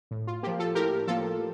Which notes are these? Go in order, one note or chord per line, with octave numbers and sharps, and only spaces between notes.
A2
F4
F3 A#3 G4
F4 A4
A2 G4 A#4
F3 A#3 F4 A4